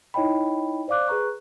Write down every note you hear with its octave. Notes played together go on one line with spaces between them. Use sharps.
D#4 E4 C#5 D#5 G5 B5
C5 D5 F5 D6 F#6
G#4 B4 A#5 C#6 F#6